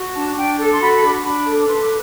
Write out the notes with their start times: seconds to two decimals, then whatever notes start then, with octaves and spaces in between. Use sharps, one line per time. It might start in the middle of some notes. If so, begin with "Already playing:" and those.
Already playing: F#4
0.15 D4 A5
0.37 D4 G5
0.59 A4 A5
0.70 C6
0.81 F#4 B5
1.03 D4
1.24 D4 B5
1.46 A4
1.68 B4 C6
1.79 D6